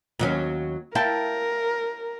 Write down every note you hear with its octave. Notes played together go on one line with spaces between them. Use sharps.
D#2 F#3 C#4
E4 A#4 F5 G5 A5